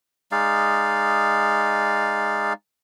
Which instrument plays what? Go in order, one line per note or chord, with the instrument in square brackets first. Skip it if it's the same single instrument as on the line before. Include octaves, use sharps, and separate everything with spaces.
[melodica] G#3 D#4 D5 F5